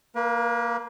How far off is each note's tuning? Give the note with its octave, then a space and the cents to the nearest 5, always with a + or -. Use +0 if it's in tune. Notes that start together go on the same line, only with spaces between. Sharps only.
A#3 +0 B4 -45